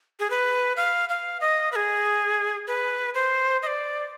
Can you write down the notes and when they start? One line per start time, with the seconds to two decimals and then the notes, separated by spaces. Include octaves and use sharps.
0.20 G#4
0.30 B4
0.77 F5
1.09 F5
1.41 D#5
1.72 B4
1.76 G#4
2.67 B4
3.15 C5
3.62 D#5
3.67 D5